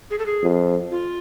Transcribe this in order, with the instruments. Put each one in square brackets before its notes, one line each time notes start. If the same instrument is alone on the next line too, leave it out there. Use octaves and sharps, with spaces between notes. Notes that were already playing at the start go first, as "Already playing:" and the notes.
[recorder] G#4
A4
G#4
[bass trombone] F2
[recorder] F4